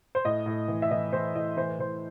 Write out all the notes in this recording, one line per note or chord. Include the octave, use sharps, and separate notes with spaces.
C5
A2 D#5
A2
E3
E5
E3 D#5
E3 C5
A2 D#5
E3 C5
B4
E3 C5